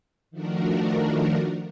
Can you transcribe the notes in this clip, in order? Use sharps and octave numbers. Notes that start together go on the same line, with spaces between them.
D#3 F3 A3 D4 F#4 A#4